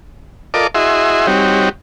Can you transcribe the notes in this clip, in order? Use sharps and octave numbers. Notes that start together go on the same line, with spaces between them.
F4 A4 A#4 D5 D#5 D6
E4 F#4 G#4 D#5 E5 C6
G3 C4 D#4 F#4 G4 C#5